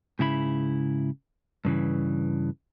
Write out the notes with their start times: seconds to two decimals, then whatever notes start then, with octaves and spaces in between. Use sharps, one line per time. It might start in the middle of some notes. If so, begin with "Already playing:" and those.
0.19 G#2 C#3 E4 B5
1.65 G2 C#3 E3